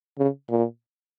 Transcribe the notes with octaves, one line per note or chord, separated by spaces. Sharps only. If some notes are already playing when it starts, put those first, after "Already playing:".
C#3
A#2